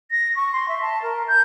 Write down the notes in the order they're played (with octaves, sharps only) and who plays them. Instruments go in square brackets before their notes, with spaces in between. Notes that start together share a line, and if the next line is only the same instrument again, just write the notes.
[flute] A#6
C#6
C6
E5
A5
A#4
G6